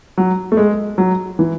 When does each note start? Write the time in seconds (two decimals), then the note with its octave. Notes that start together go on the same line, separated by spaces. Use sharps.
0.18 F#3
0.52 A3
0.57 G#3
0.98 F#3
1.39 E3